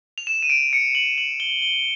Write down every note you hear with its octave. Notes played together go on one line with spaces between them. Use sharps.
F7
E7
D#7
D7
C#7
F#7
F#7
G7
G7